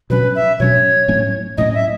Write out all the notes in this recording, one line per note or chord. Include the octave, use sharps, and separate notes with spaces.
B2 F#3 C#4 B4
E5
B2 F#3 C#4 C#5
A2 F#3 A3 C#4
A2 F#3 A3 C#4 D#5
E5